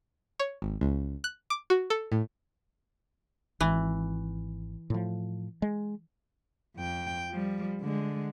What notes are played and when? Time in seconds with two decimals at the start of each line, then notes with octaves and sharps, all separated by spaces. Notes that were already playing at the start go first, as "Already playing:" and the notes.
0.40 C#5
0.62 G#1
0.81 C#2
1.24 F#6
1.50 D6
1.70 F#4
1.90 A4
2.12 A2
3.61 G#1 E3
4.90 A2 F3
5.62 G#3
6.77 F2 G5
7.31 F3 G3
7.82 D3 G#3